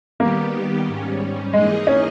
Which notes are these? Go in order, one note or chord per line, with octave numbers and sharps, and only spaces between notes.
D#3 G3 A#3 B3 G4
G#2 G3 C#4
E3 G#3 A#3 D#4 G#4 D#5
C#4